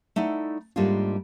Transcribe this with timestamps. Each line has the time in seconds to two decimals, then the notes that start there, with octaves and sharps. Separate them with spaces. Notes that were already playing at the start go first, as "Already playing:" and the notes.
0.16 A3 D#4 E4 D5 F#5
0.76 G#2 G3 A3 A#3 D4 F4